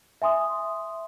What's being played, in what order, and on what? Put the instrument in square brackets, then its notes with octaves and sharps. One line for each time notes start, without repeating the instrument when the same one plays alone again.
[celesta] E5 G#5 C6 D#6